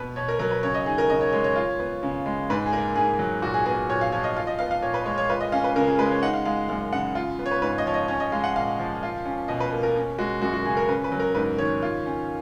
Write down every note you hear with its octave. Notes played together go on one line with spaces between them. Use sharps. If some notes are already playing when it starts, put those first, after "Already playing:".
Already playing: B2 B3 B4
B2 C#5
A#4
F#3 A#4
B4
C#3 C#5
D#5
D#4 G#4
A#4
C#3 D#5
C#5
G#3 C#5
C#5
F4
B3
C#3
G#3
G#2 B4
G#4
A#3 A#4
G#2 G#4
F#3
A#2 F#4
G#4
B3 G#4
A#2 C#5
F5
F3 C#5
D#5
F4 F5
D#5
B3 F5
F5
A#2 C#5
B4
G#3 C#5
C#5
F4 B4
D#5
C#4 F5
B4
C#3 A#4
G#4
G#3 B4
C#5
D#4 F#5
F5
G#3 F5
F#2 F5
C#3 F#5
F4
B3
C#5
B4
G#2 B4
D#5
F3 C#5
D#5
C#4 C#5
D#5
G#3 F5
F#5
A#2 F5
F3
F4
C#4
B2 D#5
B4
A#3
A#4
C#4
G#3 F#4
F#2 F#4
F#4
C#3 G#4
A#4
C#4 B4
B4
F#3
A#4
G#2 B4
D#3 C#5
F4
C#4